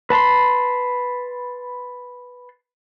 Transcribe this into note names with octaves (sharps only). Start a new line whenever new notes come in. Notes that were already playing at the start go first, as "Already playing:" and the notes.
B4 A5 B5 C6